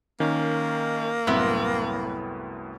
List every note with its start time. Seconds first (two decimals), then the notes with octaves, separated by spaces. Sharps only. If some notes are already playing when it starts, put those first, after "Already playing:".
0.20 D#3 A#3 C#4
1.27 C2 F#2 A2 B3 C4 E4